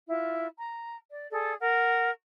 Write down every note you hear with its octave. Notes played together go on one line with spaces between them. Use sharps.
E4 F4
A#5
D5
G#4 A4 D5
A#4 F#5